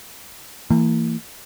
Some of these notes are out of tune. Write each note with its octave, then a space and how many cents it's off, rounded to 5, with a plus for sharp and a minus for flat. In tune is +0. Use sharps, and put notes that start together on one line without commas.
E3 +0 A#3 -40